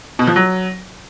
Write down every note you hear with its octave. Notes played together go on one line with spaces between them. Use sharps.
B2
F3
F#3